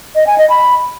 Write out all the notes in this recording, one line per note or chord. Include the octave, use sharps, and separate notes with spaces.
D#5
G#5
D#5
B5